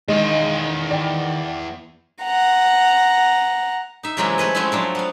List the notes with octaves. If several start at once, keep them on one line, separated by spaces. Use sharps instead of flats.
E2 D#3 G#3 D#5
D5 G5
F#5 A#5
D#4 E5
C3 E3 F#3 G#3 A#3 C#4
A3 G#4 B4 D#5
F3 G#3 A3 C4 C#4 E4
F3 F#3 D4
B3 F5